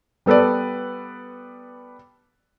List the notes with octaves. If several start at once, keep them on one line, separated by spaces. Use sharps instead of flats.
G3 B3 A4 B4 D5